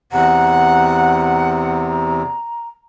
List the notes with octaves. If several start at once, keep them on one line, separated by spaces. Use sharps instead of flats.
E2 C3 F#5 A#5